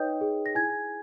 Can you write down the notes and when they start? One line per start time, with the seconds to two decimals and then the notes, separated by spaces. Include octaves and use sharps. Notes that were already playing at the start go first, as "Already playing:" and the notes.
Already playing: D#4 B4 C#5 D#5 G5 D#6 G6
0.21 G#4
0.46 A#6
0.55 E4 G#5 G#6